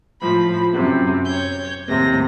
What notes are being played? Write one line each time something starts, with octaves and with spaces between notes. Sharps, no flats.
A2 F3 B5
F#2 C3
C#5 G6
D#2 A2 C3 A#6